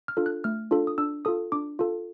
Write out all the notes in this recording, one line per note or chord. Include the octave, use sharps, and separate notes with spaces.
F6
D4 F4 A4
F#6
A3 F6
D4 F4 A4
D#6
D4 E6
F4 A4 D#6
D4 D6
F4 A4